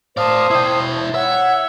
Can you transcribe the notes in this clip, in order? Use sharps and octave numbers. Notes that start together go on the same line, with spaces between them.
C5 D5 F5 A5 D#6
E4 G5
C#5 E5 F#5